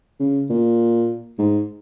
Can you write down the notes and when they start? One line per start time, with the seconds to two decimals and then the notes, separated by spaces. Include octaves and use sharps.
0.20 C#3
0.50 A#2
1.39 G#2